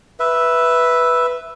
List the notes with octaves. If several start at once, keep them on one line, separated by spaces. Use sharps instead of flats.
B4 E5